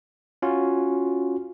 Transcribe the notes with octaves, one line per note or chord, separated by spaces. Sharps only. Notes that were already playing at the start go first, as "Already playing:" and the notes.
C#4 F4 F#4